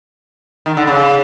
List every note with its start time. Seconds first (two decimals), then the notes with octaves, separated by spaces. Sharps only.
0.66 D#3
0.77 D3
0.87 C#3